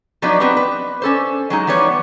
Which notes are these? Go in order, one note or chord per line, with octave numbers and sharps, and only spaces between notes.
F3 F#3 B3 D4 D#4 B4
F3 B3 C4 G4 B4
B4
C#4 A4 C5
F#3 G#3 D#4
E3 F3 G3 B3 C#5